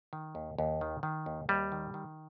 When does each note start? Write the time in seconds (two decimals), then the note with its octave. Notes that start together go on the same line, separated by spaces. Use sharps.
0.13 D#3
0.35 D#2
0.59 D#2
0.81 D#3
1.03 D#3
1.26 D#2
1.49 D#2 G3
1.72 D#3
1.94 D#3